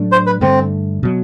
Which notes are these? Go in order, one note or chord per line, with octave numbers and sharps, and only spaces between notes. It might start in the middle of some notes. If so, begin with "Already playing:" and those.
Already playing: A2 F#3 A3 D4
C5
B4
G2 D3 A3 C4
B2 F#3